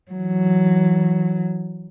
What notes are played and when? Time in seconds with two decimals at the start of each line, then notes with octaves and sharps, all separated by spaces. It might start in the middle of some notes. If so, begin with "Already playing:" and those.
0.12 E3 F#3